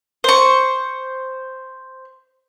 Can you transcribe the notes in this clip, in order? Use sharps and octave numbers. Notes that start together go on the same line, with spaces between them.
C5 C#6